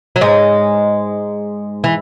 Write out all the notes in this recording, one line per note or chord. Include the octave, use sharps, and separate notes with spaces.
F#3
G#2 G#3
E3